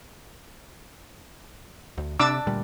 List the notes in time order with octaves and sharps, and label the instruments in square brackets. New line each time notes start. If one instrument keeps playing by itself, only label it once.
[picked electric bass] D2
[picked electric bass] C3 [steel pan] D4 D6 E6
[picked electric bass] D2 A#2 G3